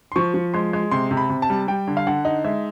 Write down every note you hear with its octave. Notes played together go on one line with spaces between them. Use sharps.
C6
F3 C#6
F3
G#3 C6
G#3
C3 C6
C3
B5
C3
A5
G3
G3 G5
D3
F5
D3 F#5
D#4
G#3 E5